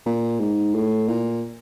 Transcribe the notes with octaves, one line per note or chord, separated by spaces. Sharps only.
A#2
G#2
A2
A#2